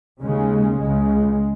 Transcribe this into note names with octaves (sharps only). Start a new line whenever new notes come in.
D#2 C#3 G#3
C#2 C#3 G#3